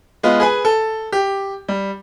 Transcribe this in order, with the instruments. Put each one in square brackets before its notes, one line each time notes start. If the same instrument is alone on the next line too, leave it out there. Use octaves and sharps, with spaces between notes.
[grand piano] G#3 B3 F4
G#4 B4 G#5
A4
G4
G3